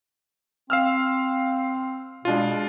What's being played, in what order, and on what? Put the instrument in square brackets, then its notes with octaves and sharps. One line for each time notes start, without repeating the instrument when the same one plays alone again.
[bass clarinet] C4 [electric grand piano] F5 E6 F6
[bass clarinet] B2 [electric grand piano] G#3 D4 F4